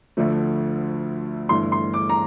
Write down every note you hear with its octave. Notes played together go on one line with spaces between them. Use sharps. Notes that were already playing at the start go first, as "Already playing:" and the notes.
D2 D3 F3 A3
G1 G2 E3 A3 C6
C6
D6
A#5